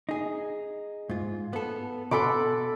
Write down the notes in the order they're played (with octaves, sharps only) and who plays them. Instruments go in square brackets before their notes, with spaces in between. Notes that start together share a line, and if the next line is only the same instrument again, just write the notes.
[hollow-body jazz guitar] D#4 G#4
G#2 F4
B3 A4
[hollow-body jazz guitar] B2 F#5 C6 [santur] A4 B5 D6